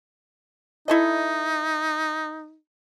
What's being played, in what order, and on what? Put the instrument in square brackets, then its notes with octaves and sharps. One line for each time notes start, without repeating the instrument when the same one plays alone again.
[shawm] D#4 [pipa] E4 A4 D#5